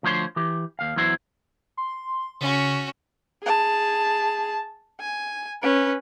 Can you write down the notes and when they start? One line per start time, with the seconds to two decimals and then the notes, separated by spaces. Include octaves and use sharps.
0.03 D2 F3 E4 C5 C#5 C6
0.36 E3 G4
0.79 D#2 F5
0.96 E2 F#3 E4 C5
1.77 C6
2.41 C#3 C#4 F#4
3.43 G#4 A5
5.00 G#5
5.63 C#4 B4